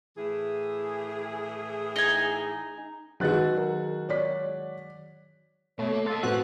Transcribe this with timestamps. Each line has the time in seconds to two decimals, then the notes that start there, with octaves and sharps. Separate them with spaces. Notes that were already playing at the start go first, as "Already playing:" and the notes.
0.17 A2 E3 G#4
1.96 D#4 G#5
3.20 D#3 F#3 G#3 F#4 B4 F#6 A6
3.57 A#4
4.09 C#5 D5 B6
5.79 B2 A3 C#5
5.93 A#3
6.06 A4 D#5 F5 C6
6.23 A2 F#3 C4 F#4 A#4 B4 F#6